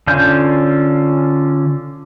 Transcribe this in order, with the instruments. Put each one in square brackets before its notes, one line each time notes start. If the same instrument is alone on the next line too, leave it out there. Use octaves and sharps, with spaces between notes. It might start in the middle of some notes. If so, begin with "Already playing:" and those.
[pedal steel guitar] D3 C#4 F4 F5 G6